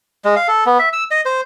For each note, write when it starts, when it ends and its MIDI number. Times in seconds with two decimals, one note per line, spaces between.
0.25 0.35 56
0.36 0.47 77
0.48 0.64 69
0.66 0.79 59
0.79 0.89 76
0.93 1.04 88
1.11 1.21 75
1.25 1.41 72